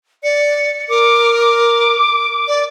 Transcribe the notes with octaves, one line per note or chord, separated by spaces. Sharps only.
D5 C#7
A#4 D6
D6
D5